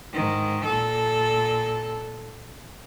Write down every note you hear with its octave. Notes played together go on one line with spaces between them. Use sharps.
G#2 D#3
A#2 A4